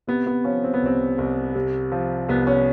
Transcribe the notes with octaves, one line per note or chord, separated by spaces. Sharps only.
C3 B3
B3
F3 C#4
C4
B3
C2 C4
C2
C3
F3
C2 B3
C#4